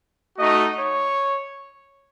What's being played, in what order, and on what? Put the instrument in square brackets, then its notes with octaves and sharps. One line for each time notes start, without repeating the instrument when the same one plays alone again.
[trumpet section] A3 D#4 F#4 D#5
C#5